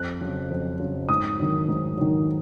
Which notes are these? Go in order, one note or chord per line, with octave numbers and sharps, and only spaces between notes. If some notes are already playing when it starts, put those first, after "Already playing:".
Already playing: F2 F#6
C#3 F#3
F2
C#3 F#3
G#2 D#6
D#3 F#3
G#2
D#3 F#3